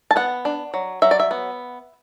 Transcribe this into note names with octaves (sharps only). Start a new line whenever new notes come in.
A5
B3 F#5
D4
F#3
F#3 E5
D5
E5
B3